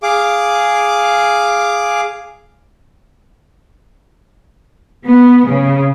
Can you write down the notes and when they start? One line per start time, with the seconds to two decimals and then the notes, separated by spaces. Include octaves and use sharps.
0.03 G#4 F5 D6
5.05 B3
5.47 C#3